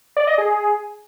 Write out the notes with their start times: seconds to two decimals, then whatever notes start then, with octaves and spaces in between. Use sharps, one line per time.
0.17 D5
0.27 D#5
0.38 G#4